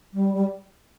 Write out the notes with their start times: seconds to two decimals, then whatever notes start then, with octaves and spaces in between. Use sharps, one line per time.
0.14 G3
0.34 G3